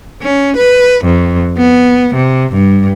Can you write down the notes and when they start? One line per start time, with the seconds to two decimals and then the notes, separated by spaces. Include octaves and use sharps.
0.22 C#4
0.57 B4
1.04 F2
1.58 B3
2.14 C3
2.52 G2